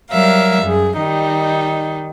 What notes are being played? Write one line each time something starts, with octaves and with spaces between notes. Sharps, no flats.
F#3 G3 A#4 E5 F5
F#2 G#4
D#3 G3 D#4